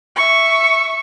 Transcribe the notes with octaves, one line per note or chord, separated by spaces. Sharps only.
E5 C#6